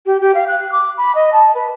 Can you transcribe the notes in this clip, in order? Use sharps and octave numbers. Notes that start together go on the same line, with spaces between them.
G4
G4
F5
F#6
D6
B5
D#5
A5
B4